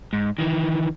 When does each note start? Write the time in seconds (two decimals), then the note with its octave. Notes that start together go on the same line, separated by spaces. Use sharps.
0.13 G#2
0.38 D#3 E3